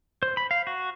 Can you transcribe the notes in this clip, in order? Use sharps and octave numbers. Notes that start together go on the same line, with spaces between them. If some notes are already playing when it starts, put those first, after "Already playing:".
C5
B5
F5
F#4